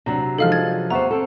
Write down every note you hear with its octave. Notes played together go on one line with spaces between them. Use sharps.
C3 F#3 D4 A#5
F3 G#3 D#4 A4 F5 F6
F6 G#6 A6
B3 G4 C5 E5 F#5 A#5 C#6
C4 A4